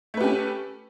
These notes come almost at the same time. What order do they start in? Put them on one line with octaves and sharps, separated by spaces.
A3 B4 G4 C#4